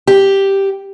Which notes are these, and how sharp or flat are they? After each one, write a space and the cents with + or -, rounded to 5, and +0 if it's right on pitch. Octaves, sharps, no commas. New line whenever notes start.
G4 +0